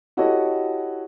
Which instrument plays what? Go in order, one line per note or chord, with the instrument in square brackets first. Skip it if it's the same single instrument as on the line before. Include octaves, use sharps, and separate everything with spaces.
[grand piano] E4 F#4 G4 A4 C#5 D#5